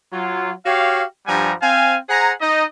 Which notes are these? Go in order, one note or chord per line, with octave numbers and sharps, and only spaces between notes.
F#3 F4
F#4 G4 C#5 F5
G2 F3 G3 F#5 G#5 A#5
C4 F5 G#5
G#4 C5 F#5 G#5 A#5
D#4 D#5